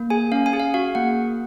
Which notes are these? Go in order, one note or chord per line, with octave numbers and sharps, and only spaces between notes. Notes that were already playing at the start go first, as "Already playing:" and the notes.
Already playing: A#3
G#4 G#5
C#4 F5
G#5
G#4
F5
F#4 F5
A#3 F#5